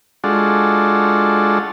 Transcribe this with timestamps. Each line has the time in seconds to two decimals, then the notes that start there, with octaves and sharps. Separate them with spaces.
0.24 G#3 D4 F4 F#4 A4